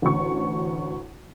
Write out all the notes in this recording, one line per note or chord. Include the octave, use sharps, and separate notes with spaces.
A1 D2 C#6